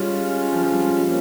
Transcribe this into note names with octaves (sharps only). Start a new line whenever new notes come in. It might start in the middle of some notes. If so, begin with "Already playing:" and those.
Already playing: G3 G#3 C#4 F4
F3
F3
G3
F3 A#3 C#4